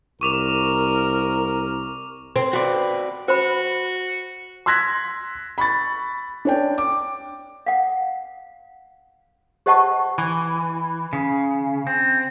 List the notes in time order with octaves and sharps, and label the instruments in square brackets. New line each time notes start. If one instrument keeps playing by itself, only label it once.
[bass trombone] C2 [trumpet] A#4 [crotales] C#6 D6 F7
[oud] C4
[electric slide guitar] F#4 B4 D5
[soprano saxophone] F#4 [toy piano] C5 B5
[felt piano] C6 E6 F#6 G#6 A#6 B6
B5 C#6 A6
D4 C#5 G5
D6
[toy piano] F5 F#5
G4 C5 D#5 F#5 A5 C#6
[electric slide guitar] E3
C#3
C4